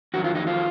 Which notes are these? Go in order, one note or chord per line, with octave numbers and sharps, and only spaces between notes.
F2 D#3 F#3 F#4
F4
D#4
F4